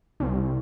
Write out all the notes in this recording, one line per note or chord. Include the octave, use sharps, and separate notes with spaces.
C2